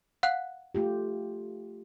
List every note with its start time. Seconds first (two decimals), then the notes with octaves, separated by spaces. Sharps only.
0.23 F5 F#5 F#6
0.75 A3 F4 G4